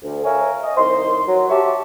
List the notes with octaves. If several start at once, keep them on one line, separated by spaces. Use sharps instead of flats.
D2
A#4 C#5 E5 F5 G#5
D#5
C2 D#3 C5 C6
F#3
F#4 G4 E5 A5 C#6